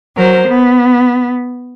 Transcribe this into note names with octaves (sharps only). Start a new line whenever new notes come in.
F#3 A#4 C5
B3